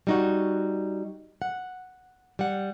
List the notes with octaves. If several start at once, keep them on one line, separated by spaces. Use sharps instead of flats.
G3 D#4 F#4
F#5
G3 F#5